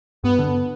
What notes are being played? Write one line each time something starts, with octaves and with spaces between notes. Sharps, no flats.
G2 B3
D3